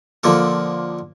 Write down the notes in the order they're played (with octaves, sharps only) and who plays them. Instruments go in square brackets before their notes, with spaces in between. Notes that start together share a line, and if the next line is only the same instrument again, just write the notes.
[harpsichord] D3 F3 A#3 A4